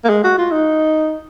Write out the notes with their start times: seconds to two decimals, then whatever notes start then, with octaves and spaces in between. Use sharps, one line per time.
0.04 A#3
0.09 G#3
0.24 F#4
0.38 F4
0.52 D#4